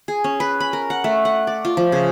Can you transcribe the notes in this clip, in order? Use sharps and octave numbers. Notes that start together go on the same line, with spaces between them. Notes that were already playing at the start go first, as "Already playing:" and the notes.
G#4
C#4
B4
B5
A#4
F#5
A3
F#5
D5
F4
F3
C#3